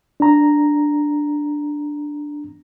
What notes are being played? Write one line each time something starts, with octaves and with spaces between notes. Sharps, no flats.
D4 A#5